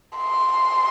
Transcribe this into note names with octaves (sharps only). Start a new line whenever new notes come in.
C6